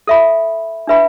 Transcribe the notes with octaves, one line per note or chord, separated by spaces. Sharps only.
A4 E5 B5
D4 B4 E5 B5